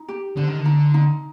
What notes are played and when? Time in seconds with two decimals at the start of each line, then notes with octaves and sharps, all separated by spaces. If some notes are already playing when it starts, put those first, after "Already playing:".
Already playing: D#4
0.08 G4
0.36 D3 C5
0.47 D#3
0.59 D3
0.65 D#4
0.94 D#4